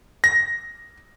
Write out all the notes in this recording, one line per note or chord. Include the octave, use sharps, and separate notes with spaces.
A#6